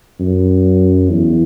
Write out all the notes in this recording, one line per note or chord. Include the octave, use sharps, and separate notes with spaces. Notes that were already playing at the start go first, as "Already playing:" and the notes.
F#2
E2